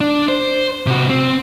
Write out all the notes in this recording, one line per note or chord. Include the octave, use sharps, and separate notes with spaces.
D4
C5
C3 F#4
C4